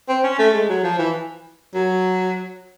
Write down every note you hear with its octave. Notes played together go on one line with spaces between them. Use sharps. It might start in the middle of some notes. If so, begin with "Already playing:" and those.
C4
C#4
A3
G#3
F#3
F3
E3
F#3